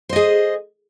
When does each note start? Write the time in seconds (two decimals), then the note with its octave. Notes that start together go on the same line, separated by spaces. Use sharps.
0.09 C5
0.13 D#5
0.16 G#4